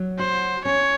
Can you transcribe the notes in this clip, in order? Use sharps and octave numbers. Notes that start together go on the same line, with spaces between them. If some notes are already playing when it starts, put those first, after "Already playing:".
Already playing: F#3
F#4 C5
C#4 C#5